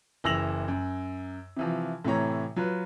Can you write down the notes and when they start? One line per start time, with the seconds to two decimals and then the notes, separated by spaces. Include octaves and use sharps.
0.24 F#1 E3 E6 A#6 F7 F#7
0.68 F#2
1.57 C3 E3 F3
2.05 A2 C3 E3 C#5 A#5
2.56 F#3 F4 B4